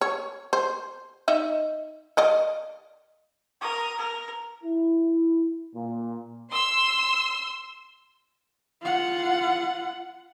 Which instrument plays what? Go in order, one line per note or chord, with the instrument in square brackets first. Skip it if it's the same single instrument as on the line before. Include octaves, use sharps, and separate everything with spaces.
[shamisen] C#5
C5
D#4 D#5 E5
D5 D#5 F5
[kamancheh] A#4 D#6
A#4
[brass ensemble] E4
A#2
[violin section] C6 E6
[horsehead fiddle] F4 F#5